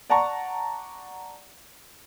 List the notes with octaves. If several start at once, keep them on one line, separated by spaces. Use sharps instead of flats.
D5 F#5 A5 A#5 C#6